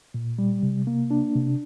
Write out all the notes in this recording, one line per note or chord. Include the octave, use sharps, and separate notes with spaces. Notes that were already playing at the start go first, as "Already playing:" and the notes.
A#2
G3
C3
A#3
D4
C3